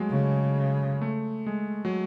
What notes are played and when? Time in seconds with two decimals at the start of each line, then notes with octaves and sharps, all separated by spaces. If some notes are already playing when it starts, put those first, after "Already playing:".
Already playing: F#3 G#3 A3
0.10 C#3
1.01 A3
1.46 G#3
1.85 F#3